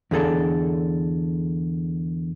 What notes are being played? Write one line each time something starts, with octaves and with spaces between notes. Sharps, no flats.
E2 D3 G#4 A4